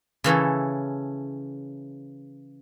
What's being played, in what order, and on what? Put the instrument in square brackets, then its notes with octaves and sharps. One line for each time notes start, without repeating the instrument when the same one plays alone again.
[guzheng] C#3 E3 C#4 A4